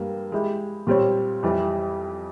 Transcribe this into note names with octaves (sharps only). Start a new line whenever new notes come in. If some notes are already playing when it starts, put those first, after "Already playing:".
Already playing: G2 G3 A#3
G#3 E4 G4
A#2 G3 C4 G4 C#5
F2 E3 G3